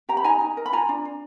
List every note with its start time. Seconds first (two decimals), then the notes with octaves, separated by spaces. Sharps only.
0.09 G4 A#5
0.17 B5
0.24 D#4 G#5 A#5
0.41 D#4
0.57 A#4
0.66 B5
0.72 F4 G#5 A#5
0.89 D4
1.05 D4